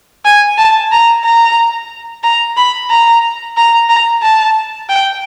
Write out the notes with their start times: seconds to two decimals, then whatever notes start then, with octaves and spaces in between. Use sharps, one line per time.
0.25 G#5
0.58 A5
0.92 A#5
1.25 A#5
2.23 A#5
2.57 B5
2.90 A#5
3.57 A#5
3.89 A#5
4.23 A5
4.89 G5